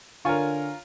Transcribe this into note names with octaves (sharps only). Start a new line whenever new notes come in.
D3 F4 A#4 C#5 G#5 C#6